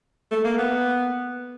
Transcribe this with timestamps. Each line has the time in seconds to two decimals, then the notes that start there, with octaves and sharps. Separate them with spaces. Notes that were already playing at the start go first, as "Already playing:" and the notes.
0.32 A3
0.44 A#3
0.58 B3